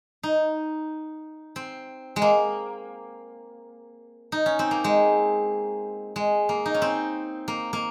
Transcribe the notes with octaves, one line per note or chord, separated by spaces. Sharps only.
D#4
C4
G#3
A#3
D#4
C#4
C4
A#3
G#3
G#3
A#3
D#4
C#4
C4
A#3
A#3